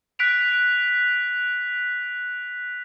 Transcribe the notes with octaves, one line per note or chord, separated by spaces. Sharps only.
F#6 B6 D7 F7